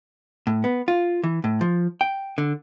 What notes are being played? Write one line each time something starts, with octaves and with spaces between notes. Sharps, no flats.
A2
B3
F4
E3
A2
F3
G5
D3